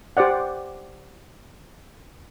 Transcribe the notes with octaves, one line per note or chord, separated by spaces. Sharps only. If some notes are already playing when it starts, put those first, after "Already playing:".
G4 C5 D5 F#5